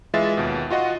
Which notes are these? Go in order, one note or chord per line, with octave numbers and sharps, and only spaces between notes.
E3 G#3 F4 E5 A6
D#2 B2
F4 F#4 D#5 F#5 C6